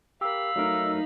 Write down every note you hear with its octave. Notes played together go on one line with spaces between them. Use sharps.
G4 A#4 F5 B5 E6
F#3 A3 D#4 A#4